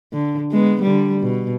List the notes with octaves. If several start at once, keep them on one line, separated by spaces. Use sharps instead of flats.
D3
G#3 B3
D3 G3
B2